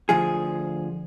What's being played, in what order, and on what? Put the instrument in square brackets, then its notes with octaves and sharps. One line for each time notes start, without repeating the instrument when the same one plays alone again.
[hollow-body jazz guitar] D2 F3 G#4